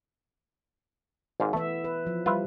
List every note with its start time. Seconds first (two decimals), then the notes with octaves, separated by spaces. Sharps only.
1.40 G#1 G#2 F5
1.53 E3 A3 B3 E5
1.84 B4
2.07 F3
2.26 G3 F4 B4 E5